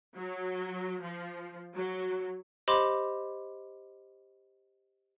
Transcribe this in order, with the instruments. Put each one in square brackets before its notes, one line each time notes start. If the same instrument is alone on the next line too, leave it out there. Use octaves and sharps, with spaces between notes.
[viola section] F#3
F3
F#3
[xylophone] G4 C5 D#5 B5 C6 D6